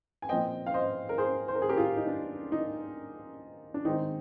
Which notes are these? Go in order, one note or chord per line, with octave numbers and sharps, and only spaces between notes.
G#5
A#2 F3 C4 D#5 G5
F5
C5 D#5
A#4
G#4 C5
C5
A#4
G#4
G4 A#4
F4 G#4
D#4
D4
D#4
D4
D#3 G#3 C4 D#4